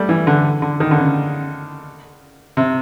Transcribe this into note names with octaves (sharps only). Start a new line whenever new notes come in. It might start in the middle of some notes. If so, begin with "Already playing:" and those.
Already playing: G3 A3
E3
D3
D3
D#3
D3
C#3
C3